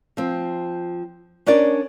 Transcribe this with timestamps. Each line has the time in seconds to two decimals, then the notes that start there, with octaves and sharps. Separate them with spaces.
0.17 F3 C4
1.46 C#4 D4 A#4 D5